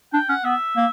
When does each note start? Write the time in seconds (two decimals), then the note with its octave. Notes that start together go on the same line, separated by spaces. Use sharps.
0.13 D4 G5
0.29 C#4 F#5
0.45 B3 E5
0.76 A#3